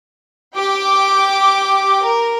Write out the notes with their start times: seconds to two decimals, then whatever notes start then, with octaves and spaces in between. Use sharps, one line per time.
0.55 G4 G5 D6
2.02 A#4